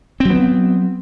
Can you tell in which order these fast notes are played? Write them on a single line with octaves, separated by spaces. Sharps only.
C4 F#3 B3